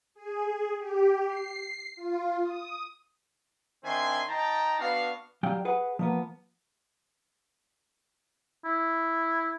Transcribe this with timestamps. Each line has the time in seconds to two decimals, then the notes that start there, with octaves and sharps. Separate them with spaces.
0.15 G#4
0.77 G4
1.27 C7
1.96 F4
2.43 D#6
3.84 D#3 C4 D4 E5 G#5 C6
4.28 D#4 G5 A5 A#5
4.79 B3 D4 F#4 F5
5.43 F#3 G3 F5 G5
5.65 G#4 B4 F#5
5.99 F3 A#3 B3
8.65 E4